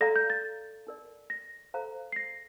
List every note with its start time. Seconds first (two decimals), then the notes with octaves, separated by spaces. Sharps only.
0.01 A4 D5 F5 A#5 A#6
0.16 G6
0.30 A6
0.87 D#4 A#4 D5
1.30 A#6
1.74 A4 C5 F5 A#5
2.12 C7
2.16 A#6